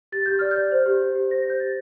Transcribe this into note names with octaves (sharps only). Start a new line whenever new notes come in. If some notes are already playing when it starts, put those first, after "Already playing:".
G4 A6
G4 G6
D5 F6
G6
D5
C5
G4
G4
G4
C5 A#6
C5 G6
G4 A6